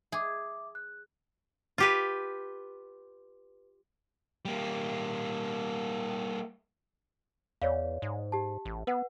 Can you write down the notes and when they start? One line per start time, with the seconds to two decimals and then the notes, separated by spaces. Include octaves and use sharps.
0.12 G#4 E5 D6
0.75 F#6
1.78 F4 G4 B4
4.45 G3 A#3
7.62 E2 C#5 D5 F5
8.02 G#2
8.32 G4 A5
8.65 A1
8.87 B3 B4 F#5